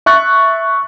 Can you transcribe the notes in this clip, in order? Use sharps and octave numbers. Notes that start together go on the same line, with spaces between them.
E5 C#6 F#6 A6